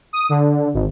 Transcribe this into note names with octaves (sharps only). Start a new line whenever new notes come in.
D#6
D3
G#1